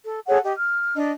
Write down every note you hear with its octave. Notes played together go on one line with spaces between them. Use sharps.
A4
G#4 A4 C#5 F#5
G4 D#5
F6
D4 D#5